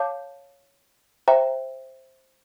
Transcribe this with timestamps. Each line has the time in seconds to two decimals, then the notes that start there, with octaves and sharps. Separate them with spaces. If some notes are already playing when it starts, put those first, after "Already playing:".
Already playing: C#5 F5 A5 D6 G6
1.28 C5 E5 G5 A#5